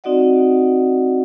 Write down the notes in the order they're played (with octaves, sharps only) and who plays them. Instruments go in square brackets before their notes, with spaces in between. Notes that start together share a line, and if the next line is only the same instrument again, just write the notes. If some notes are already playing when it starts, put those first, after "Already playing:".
[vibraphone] C4 D#4 F#4 D5 D#5 F#5